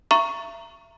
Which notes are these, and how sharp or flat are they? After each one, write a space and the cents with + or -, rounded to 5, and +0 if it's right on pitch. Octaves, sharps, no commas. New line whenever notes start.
E5 +35 A#5 +0 C#6 +0